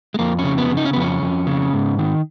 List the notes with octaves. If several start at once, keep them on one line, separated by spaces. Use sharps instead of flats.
G#3
F2 A#3
C#4
C#3
B3
C#3
D#4
C#4
F2 B3
C#4
F2
C#3
G#2
D#3